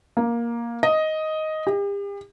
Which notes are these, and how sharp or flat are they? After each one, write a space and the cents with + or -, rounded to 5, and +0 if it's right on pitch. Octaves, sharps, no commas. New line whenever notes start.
A#3 +10
D#5 +5
G4 +40